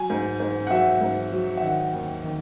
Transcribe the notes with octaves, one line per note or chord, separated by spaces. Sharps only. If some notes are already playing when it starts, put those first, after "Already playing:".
Already playing: F#3 G#5
G#2
G#2
F#5
F#3 E5
G#2
F#3
E5
D#3 F#5
D#2
D#3